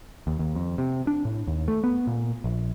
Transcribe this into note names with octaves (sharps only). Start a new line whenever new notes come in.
D#2
D#2
F2
C3
D4
A2
D#2
A3
B3
A#2
A#1